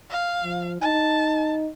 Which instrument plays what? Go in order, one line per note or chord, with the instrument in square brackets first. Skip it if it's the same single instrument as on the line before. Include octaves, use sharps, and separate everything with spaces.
[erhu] F5
[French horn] F3
[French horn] D#4 [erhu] A5